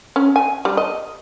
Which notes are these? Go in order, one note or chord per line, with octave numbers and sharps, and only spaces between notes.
C#4
G#5
G3
D#5